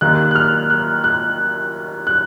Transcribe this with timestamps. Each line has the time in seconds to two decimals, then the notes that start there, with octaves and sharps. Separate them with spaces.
0.01 D#2 D#3 A#3 F#6
0.31 F#6
0.35 F6
0.70 F#6
1.04 F#6
2.07 F#6